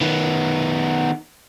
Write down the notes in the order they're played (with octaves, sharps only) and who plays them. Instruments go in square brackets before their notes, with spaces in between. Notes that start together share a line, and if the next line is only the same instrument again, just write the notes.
[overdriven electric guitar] D#3 B3